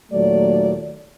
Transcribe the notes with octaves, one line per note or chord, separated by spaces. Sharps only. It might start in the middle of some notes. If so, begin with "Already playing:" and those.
D#2 A#2 F#3 A3 D5